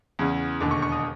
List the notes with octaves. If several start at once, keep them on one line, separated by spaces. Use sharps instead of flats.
E2 C#3 E3
E1 D#2 D3 D6
C#6
C#6
D#6